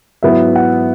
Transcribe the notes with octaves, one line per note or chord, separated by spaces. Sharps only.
G#2 F#3 B3 E4 E5
F#5